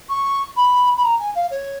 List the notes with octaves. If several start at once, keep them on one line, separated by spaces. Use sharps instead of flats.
C#6
B5
B5
A#5
G#5
F5
C#5